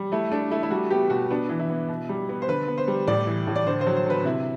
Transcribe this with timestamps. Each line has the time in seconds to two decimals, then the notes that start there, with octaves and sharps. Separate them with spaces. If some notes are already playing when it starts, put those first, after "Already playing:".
Already playing: G3
0.12 A3 E4
0.32 A3 D4
0.51 A3 E4
0.63 E4
0.70 G3 F#4
0.90 B3 G4
1.10 B2 F#4
1.30 B3 D4
1.49 E3
1.59 E4
1.69 B3
1.89 B2
2.09 G3
2.29 B3
2.42 C5
2.48 D3 B4
2.67 B3
2.78 C5
2.88 G3
3.07 A2 D5
3.27 E3
3.47 A2
3.56 D5
3.67 D3 C5
3.81 C5
3.87 F#3
3.96 C5
4.06 D3 B4
4.25 C3 E4